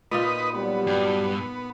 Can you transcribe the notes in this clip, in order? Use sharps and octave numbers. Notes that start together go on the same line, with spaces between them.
A#2 D#4 F4 B4 D#5
F#3 G3 B3
G2